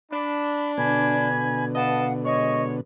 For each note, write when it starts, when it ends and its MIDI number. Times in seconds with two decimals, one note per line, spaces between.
0.11 1.53 62
0.11 0.71 83
0.77 2.81 47
0.77 2.81 50
0.77 1.65 80
0.77 1.65 83
0.77 1.65 92
1.75 2.07 71
1.75 2.07 75
1.75 2.12 77
1.75 2.12 78
1.75 2.07 81
2.24 2.74 56
2.24 2.74 73
2.24 2.62 75
2.24 2.62 85